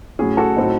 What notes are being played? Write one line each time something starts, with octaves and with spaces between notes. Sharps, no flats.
A2 F#3 C#4 G#4
F#4 A4
A2 F#3 C4 D#4